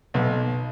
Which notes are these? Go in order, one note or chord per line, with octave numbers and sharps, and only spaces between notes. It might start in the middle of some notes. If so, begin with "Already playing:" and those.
B1